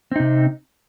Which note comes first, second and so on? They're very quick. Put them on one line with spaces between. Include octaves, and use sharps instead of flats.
C4 D#4 C3